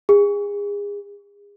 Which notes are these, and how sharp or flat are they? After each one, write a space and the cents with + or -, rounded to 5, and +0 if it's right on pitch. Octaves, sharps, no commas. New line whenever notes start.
G#4 -30